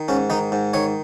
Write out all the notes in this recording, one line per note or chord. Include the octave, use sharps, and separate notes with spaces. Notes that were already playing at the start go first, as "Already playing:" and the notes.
Already playing: D#3
G#2 C#4
D#3 D#4
G#2
D#3 C#5